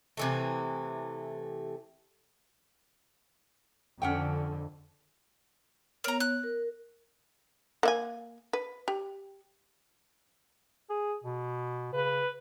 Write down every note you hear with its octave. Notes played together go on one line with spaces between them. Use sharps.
C3 E3 A3
F2 D3 C#4 F#5 G5
B3 A#4 C#5 A#5
F#6
A#4
A#3 E5 G#5
B4
G4
G#4
B2
C#3 B4